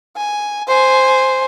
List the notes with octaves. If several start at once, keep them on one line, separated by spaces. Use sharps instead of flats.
G#5
C5 G#5